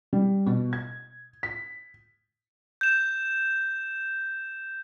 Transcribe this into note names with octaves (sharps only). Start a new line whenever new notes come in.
G3
B2
G#6
B6
G6 E7